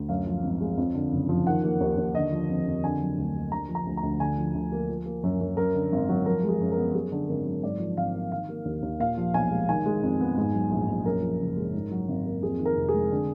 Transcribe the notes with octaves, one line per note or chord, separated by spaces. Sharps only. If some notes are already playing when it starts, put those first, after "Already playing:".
Already playing: D2
F#2 F5
F3
G#1
G#3
F2
D3
F#1
F3
D#3 F#5
A#3
D#2
D#2
D3 D#5
F3
F2
F2
D3 G#5
F#3
D2
A#3
D3 A#5
F3
A#5
D2
A#5
D2
D3 G#5
F3
D2
A#3
F3
A#3
F#2
F#2
F#2 A#4
D3
G#1
F#3
F3 A#4
G#3
G#4
F#2
A#4
B3
F#2 G#4
D3
G#1 A#4
F#3
G#2 D5
F3
G#1 F5
A#3
D#3 F5
A#3
D#2
D#2
A#2 F5
F3
B1 G#5
G#3
D#3 G#5
G#3
F2
B3
G#2
F#3
A#1
A#1
F#2 A#4
F3
F#1
G#3
G#2
F#3
G#1
A#3
F2 G#4
D#3
A#4
F1
G#4
G#3
D3